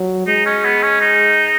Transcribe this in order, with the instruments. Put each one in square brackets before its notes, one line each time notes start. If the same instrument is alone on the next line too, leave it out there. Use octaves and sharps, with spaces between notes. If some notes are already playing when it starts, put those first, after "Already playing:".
Already playing: [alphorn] F#3
[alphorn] G#3 [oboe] D#4
[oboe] C#4
B3
C#4
D#4